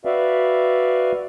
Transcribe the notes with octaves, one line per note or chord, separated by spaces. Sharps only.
F#4 B4 D5 E5 F5